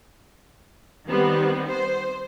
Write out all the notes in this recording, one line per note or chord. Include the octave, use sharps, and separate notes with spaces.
D#3 G3 B3 C4
C5